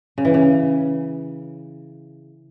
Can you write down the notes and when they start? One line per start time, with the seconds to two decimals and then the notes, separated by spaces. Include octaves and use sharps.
0.18 C#3
0.25 E3
0.34 C#3